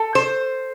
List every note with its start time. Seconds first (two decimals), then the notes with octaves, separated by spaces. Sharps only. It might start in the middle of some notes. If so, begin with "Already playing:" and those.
Already playing: A4
0.15 C5